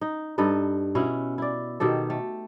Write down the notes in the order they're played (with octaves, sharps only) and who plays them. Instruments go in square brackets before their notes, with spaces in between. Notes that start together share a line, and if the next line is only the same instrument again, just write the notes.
[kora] D#4
G2 D#4 A4 B4
B2 C#4 E4 F#5
E4 D5
B2 D#3 G4 A4
A3